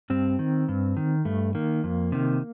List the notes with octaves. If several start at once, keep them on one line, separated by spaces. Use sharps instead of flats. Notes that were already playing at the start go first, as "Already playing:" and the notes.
G2 C4
D#3
G2
D#3
G2 A3
D#3 A#3
F2
C3 D#3